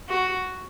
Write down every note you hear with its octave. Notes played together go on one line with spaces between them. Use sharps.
F#4